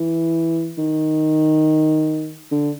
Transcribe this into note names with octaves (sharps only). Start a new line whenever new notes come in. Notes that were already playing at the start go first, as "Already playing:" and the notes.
Already playing: E3
D#3
D3